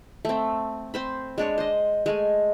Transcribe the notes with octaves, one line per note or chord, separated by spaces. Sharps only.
A3 C4
C4 C5 B5
G#3 D4 C#5
C5 D#5
G#3 A3 G#5